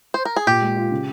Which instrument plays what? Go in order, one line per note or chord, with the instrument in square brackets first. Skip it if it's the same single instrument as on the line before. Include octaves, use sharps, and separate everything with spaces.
[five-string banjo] C5
A#4
G#4
[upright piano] A#2 [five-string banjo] G4
[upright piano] G#3
F4
C#3